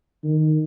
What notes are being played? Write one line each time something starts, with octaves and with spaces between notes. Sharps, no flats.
D#3